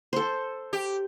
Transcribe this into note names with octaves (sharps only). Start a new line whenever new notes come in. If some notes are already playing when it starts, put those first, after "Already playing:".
A4 C5
G4